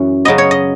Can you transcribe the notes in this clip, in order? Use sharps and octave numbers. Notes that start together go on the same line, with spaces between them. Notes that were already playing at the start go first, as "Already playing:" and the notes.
Already playing: F#2 E3 C#4
C#3 F#3 B3 D#5
C#5
D#5